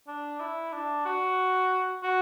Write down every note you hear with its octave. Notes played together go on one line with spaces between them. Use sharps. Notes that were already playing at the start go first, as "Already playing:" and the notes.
D4
E4
D4
F#4
F#4